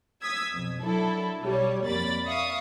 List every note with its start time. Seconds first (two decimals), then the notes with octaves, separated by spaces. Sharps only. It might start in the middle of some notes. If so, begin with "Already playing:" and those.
0.23 D#6 E6 G#6 B6
0.53 B1 F2
0.83 F#3 D4 E4 A4
1.42 B1 G3 C#5
1.85 F2 A#3 D5 B5 A6
2.27 E5 F5 C#6 D#6